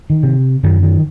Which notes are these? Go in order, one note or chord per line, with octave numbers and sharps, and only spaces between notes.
D#3
C3
F#2 D#3
D#3